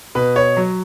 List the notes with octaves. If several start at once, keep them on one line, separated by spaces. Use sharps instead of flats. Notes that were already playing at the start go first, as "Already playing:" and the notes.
B2 B4
C#5
F#3